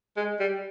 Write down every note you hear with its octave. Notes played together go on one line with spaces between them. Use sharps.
G#3
G3